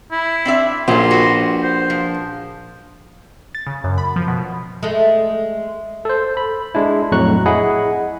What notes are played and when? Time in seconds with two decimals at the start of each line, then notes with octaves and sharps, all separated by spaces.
0.12 E4
0.45 C4 D4 E5
0.88 A#1 A#2 C#4 C6
1.11 F#4 B4
1.63 C5
1.90 F3
3.55 A6
3.67 C#3
3.84 F#2
3.98 B5
4.16 F3
4.28 B2
4.83 G#3 A3
6.05 A4 C5
6.37 B5
6.75 G#3 D4 E4
7.12 F2 A2 F#3 A#5 C#6 F#6
7.46 E4 G#4 D#5 F#5 B5